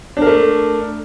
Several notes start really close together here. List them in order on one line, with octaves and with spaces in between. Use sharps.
D4 A#4 A3